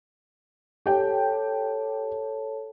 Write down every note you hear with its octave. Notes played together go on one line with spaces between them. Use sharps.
G4 A4 C#5 G5 A5